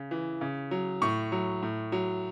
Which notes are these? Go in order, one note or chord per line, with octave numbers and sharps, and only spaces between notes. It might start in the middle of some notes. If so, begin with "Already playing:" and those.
Already playing: C#3
E3
C#3
F#3
A2 C#6
F#3
A2
F#3